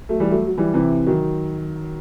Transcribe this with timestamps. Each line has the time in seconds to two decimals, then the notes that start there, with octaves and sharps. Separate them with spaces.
0.09 F#3 A3
0.20 E3 G3
0.31 F#3 A3
0.47 F#3
0.58 E3 G3
0.74 C3 E3
1.07 D#3 F#3